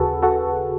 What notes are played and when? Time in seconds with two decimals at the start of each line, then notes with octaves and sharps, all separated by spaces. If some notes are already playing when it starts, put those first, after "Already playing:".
Already playing: D#2 C#3 F#4 G#4 A4 B4
0.22 F#4 A4